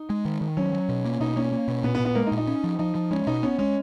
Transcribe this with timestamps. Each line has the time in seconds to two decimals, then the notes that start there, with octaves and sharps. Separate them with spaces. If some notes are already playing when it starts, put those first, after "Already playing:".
Already playing: D#4
0.10 G#3
0.25 D#3
0.41 D#3
0.57 F#3 C#4
0.73 F#3
0.89 B2
1.05 A#3
1.20 B2 D#4
1.36 A#3 C#4
1.52 A#3
1.68 B2
1.84 A#2 B3
1.95 B3
2.00 A#2
2.05 B3
2.15 G#3 A#3
2.27 D#4
2.32 A#2
2.37 D#4
2.47 C#4
2.64 F3
2.79 F3 D#4
2.95 F3
3.11 G#3 C#4
3.27 B2 D#4
3.43 B3 C#4
3.59 G#3 C#4